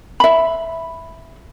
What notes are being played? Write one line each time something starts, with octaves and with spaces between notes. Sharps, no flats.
E5 B5